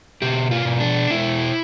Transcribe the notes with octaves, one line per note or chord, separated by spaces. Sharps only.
B2 G4
F4
B2
D4
B2 E4